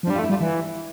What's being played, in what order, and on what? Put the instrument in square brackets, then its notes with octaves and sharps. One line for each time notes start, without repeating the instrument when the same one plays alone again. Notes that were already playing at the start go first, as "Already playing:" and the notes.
[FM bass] F3
[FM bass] G3 [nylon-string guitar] D4
[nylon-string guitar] F4
[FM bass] A3
[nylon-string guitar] E4
[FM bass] G3 [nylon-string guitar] F4
[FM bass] E3 [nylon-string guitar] E4